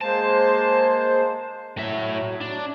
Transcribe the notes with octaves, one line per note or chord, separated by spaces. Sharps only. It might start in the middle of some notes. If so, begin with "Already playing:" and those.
G#3 A#3 C5 A5
A2 F#3 E5
D4